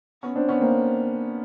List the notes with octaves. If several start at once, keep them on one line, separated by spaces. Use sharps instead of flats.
B3 C#4
C4 D4
B3 C#4
A#3 C4